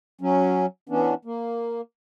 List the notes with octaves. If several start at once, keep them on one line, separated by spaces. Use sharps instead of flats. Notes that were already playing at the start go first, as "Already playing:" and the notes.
F#3 C#4
E3 B3 C#4 D4
A#3